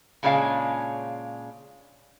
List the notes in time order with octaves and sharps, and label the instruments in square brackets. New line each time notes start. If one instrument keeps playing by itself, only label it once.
[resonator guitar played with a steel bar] A#2 C#3 G#3 C#4 D4 F5